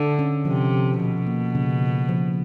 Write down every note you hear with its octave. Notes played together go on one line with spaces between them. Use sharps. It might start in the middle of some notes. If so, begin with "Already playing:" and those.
Already playing: D3 A4
C#4
C3 F3
F3
B2 F3
A#3
C#3
C#3
F3